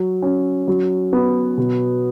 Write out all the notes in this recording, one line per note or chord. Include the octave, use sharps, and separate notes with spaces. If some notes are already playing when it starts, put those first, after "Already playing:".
Already playing: F#3
C#4
F#3
B3
B2